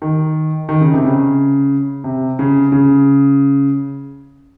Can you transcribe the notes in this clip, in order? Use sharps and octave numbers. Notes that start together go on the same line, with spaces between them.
D#3
D#3
C#3
C3
C#3
C3
C#3
C#3